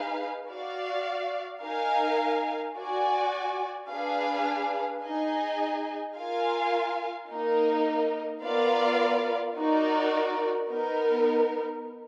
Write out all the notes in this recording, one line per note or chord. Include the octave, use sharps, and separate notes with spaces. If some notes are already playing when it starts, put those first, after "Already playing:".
Already playing: D#4 G#4 B4 F5
F#4 D5 F5
D#4 A#4 F5 G#5
F#4 D5 G#5
D4 G#4 B4 F5
D#4 G#4 D#5 G#5
F4 A#4 F5 G#5
A#3 D#4 A#4 D#5
B3 F4 A#4 D5 F5
D#4 F#4 A#4 D5
B3 D#4 A#4